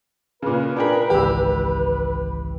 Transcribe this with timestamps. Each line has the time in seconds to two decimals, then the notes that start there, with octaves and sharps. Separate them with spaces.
0.42 A#2 C#3 B4
0.77 D4 F4 G#4 A#4 G5 B5
1.10 G#1 C#2 E3 G4 E6